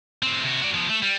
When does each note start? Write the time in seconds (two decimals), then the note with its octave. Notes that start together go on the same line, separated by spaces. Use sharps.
0.23 A2 C4
0.44 C3 F#4
0.62 F#4 D5
0.74 F3 B3
0.89 A3
1.03 G3